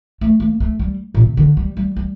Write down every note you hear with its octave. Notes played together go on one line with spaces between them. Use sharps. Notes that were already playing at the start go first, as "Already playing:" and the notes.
A3
A#3
A3
G3
A#2
C3
D3
G3
G3
G3